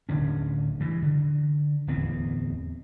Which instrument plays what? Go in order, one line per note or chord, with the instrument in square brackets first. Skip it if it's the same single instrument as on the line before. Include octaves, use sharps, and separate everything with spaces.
[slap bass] D1 D3 C#4
G2 E3
D3
D1 E2 B3 C4